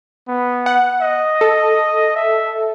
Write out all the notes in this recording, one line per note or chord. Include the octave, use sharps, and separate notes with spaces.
B3
F#5
D#5
A4
E5